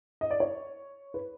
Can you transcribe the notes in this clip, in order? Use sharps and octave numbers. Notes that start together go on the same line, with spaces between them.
D#5
D5
C#5
B4